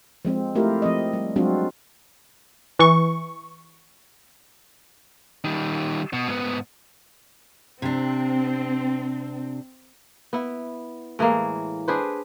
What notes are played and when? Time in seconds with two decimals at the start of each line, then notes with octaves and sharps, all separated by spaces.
0.25 F3 G#3 C4
0.55 A3 E4 F4 G4 A#4
0.82 F3 C4 D#5
1.13 G3
1.36 F#3 G#3 C4 D4 F4 F#4
2.79 E3 C#6
5.44 D#3 G3
6.13 B2
6.28 G#2 B3
7.82 C3 C4 D4
10.33 B3 E4
11.19 A2 E3 G#3 A#3
11.88 D4 G#4 B4 C5